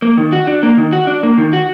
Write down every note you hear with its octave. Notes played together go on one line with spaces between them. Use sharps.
A#3
D#3
F#4
D4
A#3
D#3
F#4
D4
A#3
D#3
F#4